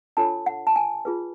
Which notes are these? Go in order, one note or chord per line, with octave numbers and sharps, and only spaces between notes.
D4 F4 A4 C#5 A5
F#5
A5
G#5
F4 G#4 B4